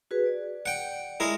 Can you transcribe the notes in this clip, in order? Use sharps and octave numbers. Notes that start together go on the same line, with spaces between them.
F#4 G#4 B4
D5
F#5 G5
G#3 E4 A#4